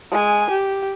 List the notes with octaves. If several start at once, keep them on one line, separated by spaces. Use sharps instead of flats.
G#3 G#5
G4